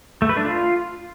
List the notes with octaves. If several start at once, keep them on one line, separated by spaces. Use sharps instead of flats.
A3
B4
D4
F4